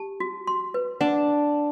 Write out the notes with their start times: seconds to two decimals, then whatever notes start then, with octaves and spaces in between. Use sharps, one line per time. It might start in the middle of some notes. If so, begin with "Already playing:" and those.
Already playing: G4 A5
0.20 F#4
0.47 C6
0.74 B4
1.01 D4 F#5